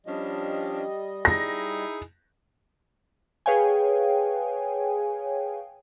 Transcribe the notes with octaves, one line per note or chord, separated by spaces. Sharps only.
F3 G3 C#4 D4 D#5
D#4 E4 G#4 A#6
G#4 B4 C#5 F5 G5 G#5